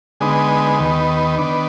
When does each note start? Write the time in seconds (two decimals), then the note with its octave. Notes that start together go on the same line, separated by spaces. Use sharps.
0.21 D3 G#3 B3 D#4
0.80 D#2 D#3 B3
1.38 D#3 B3 D4